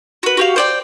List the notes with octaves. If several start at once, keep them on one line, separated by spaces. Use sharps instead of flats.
F#4 B4
F#4 G4 F5
C5 D5 G5